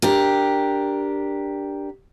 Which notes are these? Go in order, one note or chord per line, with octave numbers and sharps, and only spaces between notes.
D4 G4 A#4